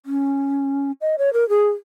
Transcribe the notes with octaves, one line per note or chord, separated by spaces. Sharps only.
C#4
D#5
C#5
A#4
G#4